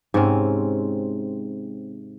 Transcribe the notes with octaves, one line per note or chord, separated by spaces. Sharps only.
G#2 C3 C4 C#4